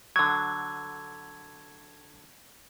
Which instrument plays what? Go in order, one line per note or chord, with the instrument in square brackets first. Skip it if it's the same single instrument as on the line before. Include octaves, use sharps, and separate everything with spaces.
[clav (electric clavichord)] D3 F#3 [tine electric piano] G#6